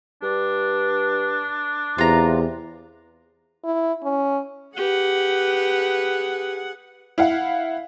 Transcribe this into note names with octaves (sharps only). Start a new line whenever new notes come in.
G2 D4
E2 C3 F4 A#5
E4
C#4
G4 G#4 B4 F#5
E4 F5 F#5